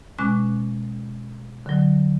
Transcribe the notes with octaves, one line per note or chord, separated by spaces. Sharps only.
B2 G#3 C#4 D6 F#6
D3 F#3